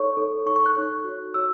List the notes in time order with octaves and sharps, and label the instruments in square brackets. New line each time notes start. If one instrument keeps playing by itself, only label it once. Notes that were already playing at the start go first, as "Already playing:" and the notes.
Already playing: [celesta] D#4 A4 C#5 C#6
D#4 A4 C#5
D#4 A4 C#5 C#6
C#6
F#6
D#4 A4 C#5
F#4 C#5
F#4 C#5 E6